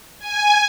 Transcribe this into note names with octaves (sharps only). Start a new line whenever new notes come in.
G#5